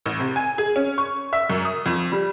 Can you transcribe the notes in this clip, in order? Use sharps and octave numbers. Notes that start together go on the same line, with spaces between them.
A1
C3
G#5
G#4
C#4
C#6
E5
F#2
D#6
F2
G3